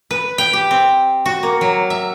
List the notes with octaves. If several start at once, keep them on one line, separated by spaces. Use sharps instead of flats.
B4
G5
G4
C4
F#4
A#3
F#3
E5